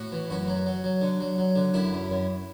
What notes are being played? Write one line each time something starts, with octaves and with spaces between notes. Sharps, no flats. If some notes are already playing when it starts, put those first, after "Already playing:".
Already playing: A2 F#4
E3
F#2 F#4
F#3
F#3
F#3
D3
F#3
F#3
D3
F#2 E4
F#2
F#2